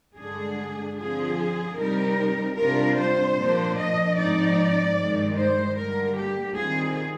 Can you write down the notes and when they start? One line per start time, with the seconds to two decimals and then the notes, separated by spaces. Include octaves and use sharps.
0.18 G2 D3 G#3 D4 G#4
0.97 D3 F3 C4 F4 G#4
1.78 C3 G3 C4 D#4 A#4
2.57 C3 G3 D4 F4 A#4
2.98 C5
3.37 A#2 F3 A#3 D4
3.77 D#5
4.17 G#2 F3 C4 D#4 D5
4.98 G2 D#3 G#3 D#4
5.38 C5
5.77 D3 G3 A#3 A#4
6.17 G4
6.57 D#3 G3 C4 F4 G#4